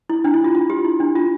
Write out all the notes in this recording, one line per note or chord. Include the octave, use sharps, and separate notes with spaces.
E4
D4
E4
F4
F4
G4
E4
D4
F4